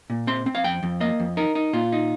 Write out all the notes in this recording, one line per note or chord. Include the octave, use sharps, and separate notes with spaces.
A#2
C4 C6
C4
F5
F2 G5
F2
A#3 D#5
F2
D#4 A#4
D#4
A#2 F4
D#4